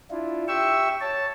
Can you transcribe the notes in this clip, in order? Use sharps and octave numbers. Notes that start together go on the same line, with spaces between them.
D4 E4 F4
G4 E5 G5 C#6 E6
C#5 A5